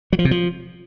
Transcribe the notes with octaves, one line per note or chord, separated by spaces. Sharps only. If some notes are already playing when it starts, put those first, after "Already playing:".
F#3
F3
C3
F3